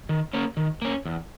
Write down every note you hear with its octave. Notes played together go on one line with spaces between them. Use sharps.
D#3
A#3 C#4
D#3
A#3 C#4
E2